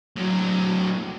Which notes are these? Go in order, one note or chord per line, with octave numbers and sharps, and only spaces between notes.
A2 F#3